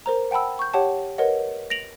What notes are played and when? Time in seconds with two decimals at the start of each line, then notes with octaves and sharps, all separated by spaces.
0.06 A#4 C5 A#5
0.31 F#5 G5 A5 B5 E6
0.59 C#6 G6
0.74 G4 C#5 F#5 G5 A5
1.18 A#4 B4 C#5 D#5 F#5
1.70 A#6 D7 F7 F#7